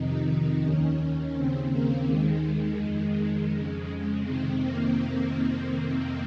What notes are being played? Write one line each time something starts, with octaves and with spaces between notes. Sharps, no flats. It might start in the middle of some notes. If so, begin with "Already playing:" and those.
Already playing: F2 C3 D#3 D#4
D#2 D#3 C#4
D#2 C#3 C4
A#3
D#2 D#3 G#3
F2 D#3 G#3
F2 C#3
F2 C3 D#3 C4
A#3